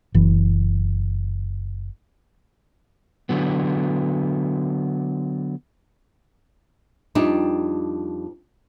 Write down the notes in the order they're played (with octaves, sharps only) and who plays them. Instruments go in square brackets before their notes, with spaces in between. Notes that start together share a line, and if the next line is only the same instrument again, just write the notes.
[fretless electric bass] F#1 E3
[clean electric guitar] D3 F#3 B3
[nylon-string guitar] F2 G3 D4 D#4